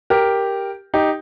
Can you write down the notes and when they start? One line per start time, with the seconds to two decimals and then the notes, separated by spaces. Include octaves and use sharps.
0.10 G4 A#4
0.94 D#4 G4